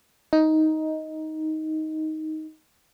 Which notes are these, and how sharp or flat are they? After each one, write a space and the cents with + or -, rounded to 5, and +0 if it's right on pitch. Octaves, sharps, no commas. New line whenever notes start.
D#4 +10